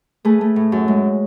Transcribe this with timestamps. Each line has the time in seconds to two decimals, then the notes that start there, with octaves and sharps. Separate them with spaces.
0.25 A3 G#4 B4
0.41 A3
0.56 A2
0.72 F#2
0.88 G#3